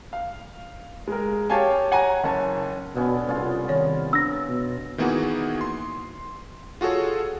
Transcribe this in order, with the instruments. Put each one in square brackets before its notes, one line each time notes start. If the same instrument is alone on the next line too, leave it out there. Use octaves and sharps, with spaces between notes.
[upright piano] F5
G#3 A#4
G4 C#5 F5 G#5 A5
C#5 F#5 G#5 A#5
F#1 C#5 A5
[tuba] B2 [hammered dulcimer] D3 B3 C#4
[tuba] C2 [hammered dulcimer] B3 C#4 F4
[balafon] D#3 C#5
[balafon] D4 [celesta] E6 A#6
[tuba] B2
[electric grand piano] D#3 E3 A#3 B3 F#4 G#4
C6
F4 F#4 G#4 A4 C#5